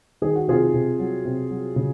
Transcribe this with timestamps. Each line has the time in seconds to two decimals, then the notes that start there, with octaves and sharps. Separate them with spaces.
0.22 D#3 G#4
0.35 F#4
0.48 C3 F4 G#4
0.74 C3
0.99 F#3
1.25 C3
1.50 F#3
1.76 C#3